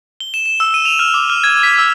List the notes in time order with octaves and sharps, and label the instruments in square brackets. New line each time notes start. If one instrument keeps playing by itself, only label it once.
[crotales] G7
E7
E7
E6
D#7
F7
F6
D6
F6
G#6
B6
E6